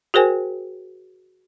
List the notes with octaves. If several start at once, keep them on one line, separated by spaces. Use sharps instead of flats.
F#4 G#4 A#4 C5 G5 G#5